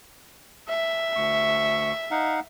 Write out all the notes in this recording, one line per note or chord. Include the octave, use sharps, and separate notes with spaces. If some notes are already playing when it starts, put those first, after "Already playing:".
E5
D2 C#6
D#4 F5 F#5